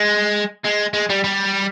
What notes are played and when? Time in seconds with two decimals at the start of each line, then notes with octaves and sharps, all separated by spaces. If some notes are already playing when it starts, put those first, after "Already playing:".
Already playing: G#3
0.65 G#3
0.94 G#3
1.10 G3
1.24 G3